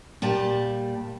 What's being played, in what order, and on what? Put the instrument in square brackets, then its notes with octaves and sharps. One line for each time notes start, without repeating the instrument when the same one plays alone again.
[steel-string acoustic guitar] A#2 G3 A5